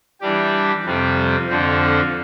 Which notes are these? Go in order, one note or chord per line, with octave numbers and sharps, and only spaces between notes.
E3 G3 D4 G4
F2 C3 G3 C4
F2 D3 F3 C4